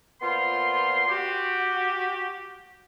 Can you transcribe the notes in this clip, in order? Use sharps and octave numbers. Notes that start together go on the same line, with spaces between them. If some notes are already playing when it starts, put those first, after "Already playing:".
A#2 B3 F4 C5 C6
F#4 G4